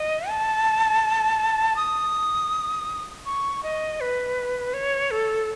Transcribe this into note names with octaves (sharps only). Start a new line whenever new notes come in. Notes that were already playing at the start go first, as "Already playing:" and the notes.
Already playing: D#5
A5
D#6
C#6
D#5
B4
C#5
A4